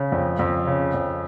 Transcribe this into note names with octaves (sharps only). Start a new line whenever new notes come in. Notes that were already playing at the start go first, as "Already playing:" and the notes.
Already playing: C#3
F2
F2
C#3
F2